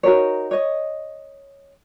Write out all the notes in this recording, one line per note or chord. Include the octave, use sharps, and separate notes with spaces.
D#4 F#4 A#4 C#5
C#5 D#5